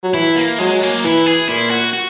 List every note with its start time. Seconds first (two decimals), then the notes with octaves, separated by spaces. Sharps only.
0.03 F#3
0.14 E3 E4
0.36 A#3
0.58 F#3 G#3
0.82 A#3
1.04 E3 E4
1.26 G#4
1.48 A#2 E4
1.71 F#4
1.93 F#4